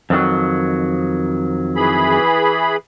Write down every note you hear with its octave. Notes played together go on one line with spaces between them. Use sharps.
F2 D#3 F#3
E3 G#4 B5